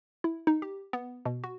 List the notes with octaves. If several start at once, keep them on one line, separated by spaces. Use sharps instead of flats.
E4
D#4
G4
B3
B2
F#4